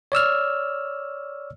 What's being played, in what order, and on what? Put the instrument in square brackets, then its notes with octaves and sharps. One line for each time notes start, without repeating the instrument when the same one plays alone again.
[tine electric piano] C#5 D5 E6 F6